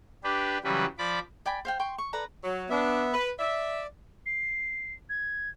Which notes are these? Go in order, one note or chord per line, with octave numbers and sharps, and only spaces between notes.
D4 G4 B4
C#3 E3 F#3 G3 B4
F3 D5 B5 D6
D5 G5 G#5 B5
C5 F5 G5
G5 C6 C#6
C#6
A4 B4 D5 A#5
F#3
B3 D4 E5
B4
D5 E5
C7
G#6